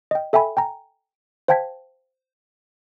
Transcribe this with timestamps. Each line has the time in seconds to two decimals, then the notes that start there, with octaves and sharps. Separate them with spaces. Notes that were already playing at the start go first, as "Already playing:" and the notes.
0.11 D#5 G5
0.33 A4 E5 G5 G#5 B5
0.57 G5 G#5 A#5
1.48 C5 F5 G5 A5 G#6 B6